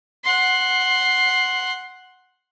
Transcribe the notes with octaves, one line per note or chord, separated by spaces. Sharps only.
F#5 C6